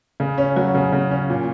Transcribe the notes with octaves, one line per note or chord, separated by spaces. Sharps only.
C#3
C#4
F#3
C#3
C#3
C#4
A#2